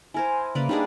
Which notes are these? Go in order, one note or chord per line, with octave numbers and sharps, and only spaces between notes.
E4 A#4 C5 G#5
C#3 A#3 B4 D5
G3 D4 D#4 G#4